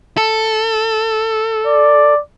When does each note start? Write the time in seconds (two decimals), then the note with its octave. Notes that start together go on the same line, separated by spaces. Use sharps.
0.17 A4
1.67 D5